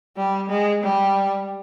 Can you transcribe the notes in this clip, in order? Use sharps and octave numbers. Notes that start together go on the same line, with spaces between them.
G3
G#3
G3